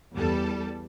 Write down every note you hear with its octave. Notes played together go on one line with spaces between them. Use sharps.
E2 G3 A4